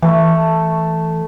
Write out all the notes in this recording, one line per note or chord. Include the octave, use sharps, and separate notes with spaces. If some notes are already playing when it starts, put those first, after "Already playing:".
E3 A3